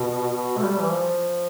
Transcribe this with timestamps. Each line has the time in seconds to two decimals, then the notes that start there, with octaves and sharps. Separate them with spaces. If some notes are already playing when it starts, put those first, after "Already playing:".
Already playing: B2
0.33 B2
0.57 A3
0.62 G3
0.80 E3
0.92 F3